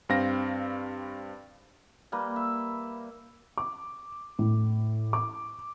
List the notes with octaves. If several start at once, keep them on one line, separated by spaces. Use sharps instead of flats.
G2 C4 F5 A#6
G3 A#3 B4
E5
D6
A2
D6